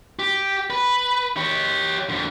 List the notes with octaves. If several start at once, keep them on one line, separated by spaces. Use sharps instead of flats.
G4
B4
G4 C#5
F2 D3